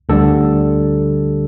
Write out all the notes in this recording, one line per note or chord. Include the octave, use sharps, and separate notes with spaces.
D2 D3 G3 A4